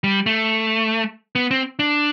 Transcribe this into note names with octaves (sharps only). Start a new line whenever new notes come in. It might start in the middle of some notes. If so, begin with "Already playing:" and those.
G3
A3
B3
C4
D4